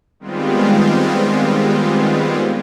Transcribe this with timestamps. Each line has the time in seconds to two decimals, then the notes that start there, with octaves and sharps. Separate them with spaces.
0.20 D#3 G3 G#3 B3 C4 F4